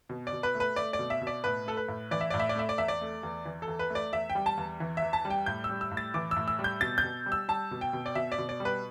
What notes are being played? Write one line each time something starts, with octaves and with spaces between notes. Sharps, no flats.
B2
D5
B2
B4
A3
B4
A3 D5
D5
B2
E5
B2
D5
A2 B4
A3 A4
B4
A2
E3 D5
E5
A2 D5
E5
D5
A3 E5
D5
E2 E5
D5
A3
E2
E3
A4
E2
B4
A3 D5
E2 E5
G5
G3
A5
E2
E3
E2 E5
A5
G3
G5
A2 G6
E6
G3
E6
A2
A6
E3 D6
E6
A2
E6
G3
G6
B2 A6
G6
B2
G3
E6
G3 A5
B2
G5
B2
D5
B2 E5
D5
B2
D5
G3
B4